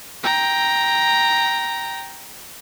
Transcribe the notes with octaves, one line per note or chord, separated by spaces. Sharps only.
G5 A#5